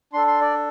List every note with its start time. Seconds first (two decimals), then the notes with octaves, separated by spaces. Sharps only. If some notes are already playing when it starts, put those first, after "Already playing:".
0.13 D4 A4 C6
0.27 C6
0.41 D5